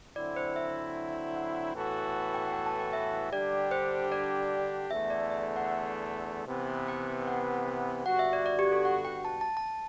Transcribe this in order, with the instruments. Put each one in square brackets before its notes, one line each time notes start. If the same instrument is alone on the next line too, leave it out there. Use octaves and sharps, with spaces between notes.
[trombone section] D3 F#3 C4 E4 [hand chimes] D5
[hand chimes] C5
E5
F#5
[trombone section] A2 E3 B3 F#4 A4
[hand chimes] G5
F#5
G5
A5
G5
E5
[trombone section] D3 G3 D4 G4 [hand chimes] D5
[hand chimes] C5
D5
[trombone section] E2 D3 A3 [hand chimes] E5
[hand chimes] D5
E5
E5
F#5
[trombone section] C3 E3 B3
[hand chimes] G5
G5
F#5
[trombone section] G2 D3 G3 B3 F#4 [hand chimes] F#5
[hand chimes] E5
D5
D5
G4
A4
F#5
G5
A5
A5
A5